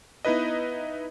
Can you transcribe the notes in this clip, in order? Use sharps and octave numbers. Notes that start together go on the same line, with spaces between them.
B3 D#4 E4 B4 D#5